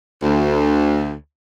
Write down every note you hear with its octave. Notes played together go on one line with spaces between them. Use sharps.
D2